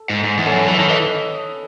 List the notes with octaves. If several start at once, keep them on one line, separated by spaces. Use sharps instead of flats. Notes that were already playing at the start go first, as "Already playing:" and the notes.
Already playing: A4
G#2
G#2
E2
A4 C#5
F#2
E3 A4 C#5
D#3 A4 C#5
E3 B4 D#5